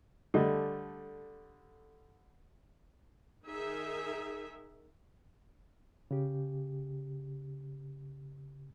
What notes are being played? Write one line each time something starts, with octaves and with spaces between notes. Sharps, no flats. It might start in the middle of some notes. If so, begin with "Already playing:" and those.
D3 G3 A3 D#5
D#3 D#4 G#4 A#4 E5
C#3 G4